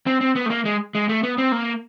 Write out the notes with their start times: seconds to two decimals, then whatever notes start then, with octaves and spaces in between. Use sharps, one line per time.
0.07 C4
0.21 C4
0.36 B3
0.46 A3
0.50 A#3
0.65 G#3
0.95 G#3
1.09 A3
1.23 B3
1.38 C4
1.52 A#3